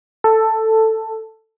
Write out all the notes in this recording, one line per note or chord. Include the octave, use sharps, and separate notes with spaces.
A4